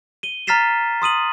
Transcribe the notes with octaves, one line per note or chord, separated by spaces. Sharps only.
D#7 G7
A#5 F6 A6 B6 C7 E7
C6 D#6 D#7 F#7